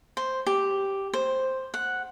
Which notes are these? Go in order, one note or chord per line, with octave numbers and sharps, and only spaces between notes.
C5
G4
C5
F#5